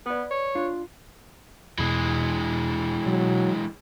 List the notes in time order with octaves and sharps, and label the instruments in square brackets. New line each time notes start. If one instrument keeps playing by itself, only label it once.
[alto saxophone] B3 [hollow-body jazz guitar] B4 D5
[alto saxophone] C#5
[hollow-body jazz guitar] D4 F4
[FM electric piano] E2 B2 [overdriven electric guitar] E3 G#3
[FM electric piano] B2 [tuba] F#3